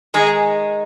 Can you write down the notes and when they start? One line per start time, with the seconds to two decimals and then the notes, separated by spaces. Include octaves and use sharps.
0.14 D#3 G#3 D#4 G#4